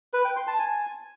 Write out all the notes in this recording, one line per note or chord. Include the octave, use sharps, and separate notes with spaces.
B4
G5
C6
A5
G#5